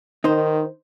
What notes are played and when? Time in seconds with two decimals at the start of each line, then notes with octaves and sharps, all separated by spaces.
0.24 D#3 D#4 C5